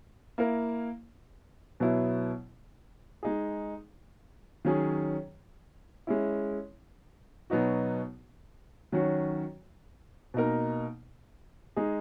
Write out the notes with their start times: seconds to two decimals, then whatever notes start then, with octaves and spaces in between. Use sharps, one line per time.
0.38 A#3 E4 A#4
1.80 B2 F#3 B3 E4
3.23 G#3 D#4 G#4
4.65 D#3 F#3 C#4 G#4
6.07 G#3 C#4 E4
7.50 B2 F#3 B3 D#4 F#4
8.92 D#3 F#3 C#4 F#4
10.34 B2 A#3 D#4 A#4
11.76 G#3 D#4 G#4